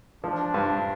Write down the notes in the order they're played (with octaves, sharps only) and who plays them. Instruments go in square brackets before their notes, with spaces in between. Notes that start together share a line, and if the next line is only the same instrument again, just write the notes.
[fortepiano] F3 [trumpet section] D4
[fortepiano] G2